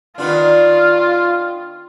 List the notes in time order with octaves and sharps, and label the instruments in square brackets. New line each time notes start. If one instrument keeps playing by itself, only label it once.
[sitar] D#3 B3 D4 [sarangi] F4